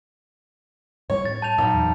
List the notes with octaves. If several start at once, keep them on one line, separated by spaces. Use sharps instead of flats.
A2 G3 C4 C#5
A6
A5 G6 F7
B1 A#2
E2